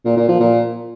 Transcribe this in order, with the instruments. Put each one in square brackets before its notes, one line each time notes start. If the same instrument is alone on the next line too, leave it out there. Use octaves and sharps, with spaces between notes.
[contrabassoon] A#2
A#2
F3
A#2